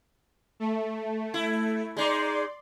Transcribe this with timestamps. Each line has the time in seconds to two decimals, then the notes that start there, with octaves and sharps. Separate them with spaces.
0.60 A3
1.34 E4
1.97 G#3 D#4 D5 C6